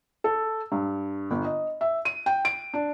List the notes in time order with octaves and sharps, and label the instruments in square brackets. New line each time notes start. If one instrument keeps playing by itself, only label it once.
[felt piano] A4
G2
G1
D#5
E5
D#7
G5
D7
D4